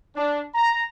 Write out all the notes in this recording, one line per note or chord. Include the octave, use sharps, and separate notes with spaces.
D4
A#5